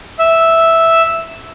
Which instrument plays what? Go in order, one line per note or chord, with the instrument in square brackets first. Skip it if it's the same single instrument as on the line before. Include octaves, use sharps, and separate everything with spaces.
[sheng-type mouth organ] E5